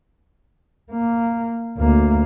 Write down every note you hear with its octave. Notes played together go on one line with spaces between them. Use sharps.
A#3
D2 A#3